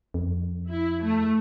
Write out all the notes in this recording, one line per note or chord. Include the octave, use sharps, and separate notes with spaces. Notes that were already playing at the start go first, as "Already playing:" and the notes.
F2
E4
A3